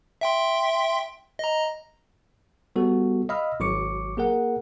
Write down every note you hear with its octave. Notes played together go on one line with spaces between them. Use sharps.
E5 G5 C6
D#5 A#5
G3 B3 F#4 A4
D#5 F5 B5 E6 F6
G#1 F#3 C#6 D6 C#7
A#3 G#4 A#4 F#5